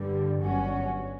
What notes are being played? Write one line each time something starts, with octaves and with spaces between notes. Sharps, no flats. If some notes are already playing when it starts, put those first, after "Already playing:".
Already playing: G1 G2 D3 G3
G1 G2 F#3 C#4 F#4